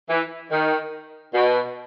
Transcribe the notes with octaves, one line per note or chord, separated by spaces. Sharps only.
E3
D#3
B2